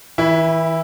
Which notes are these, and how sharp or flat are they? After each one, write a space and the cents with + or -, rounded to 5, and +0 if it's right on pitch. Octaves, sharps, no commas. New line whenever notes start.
E3 -35 E4 +0